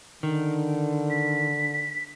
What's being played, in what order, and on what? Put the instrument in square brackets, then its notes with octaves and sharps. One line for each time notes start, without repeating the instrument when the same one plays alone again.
[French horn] D3 [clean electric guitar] D#3
[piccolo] B6